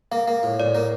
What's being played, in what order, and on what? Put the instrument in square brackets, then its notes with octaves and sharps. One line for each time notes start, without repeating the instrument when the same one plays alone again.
[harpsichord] A#3 [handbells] F5
[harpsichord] A#3
A2
[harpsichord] A2 [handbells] D5
[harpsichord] A#3